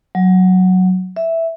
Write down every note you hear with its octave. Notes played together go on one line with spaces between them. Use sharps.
F#3
E5